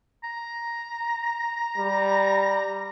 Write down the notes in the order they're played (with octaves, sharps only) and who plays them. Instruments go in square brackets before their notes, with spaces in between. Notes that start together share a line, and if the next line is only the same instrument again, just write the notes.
[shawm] A#5
[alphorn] G3